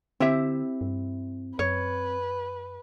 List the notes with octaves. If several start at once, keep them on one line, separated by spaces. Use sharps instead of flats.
D3 C4 E4 G4 E5
G2
F#2 B4 C#5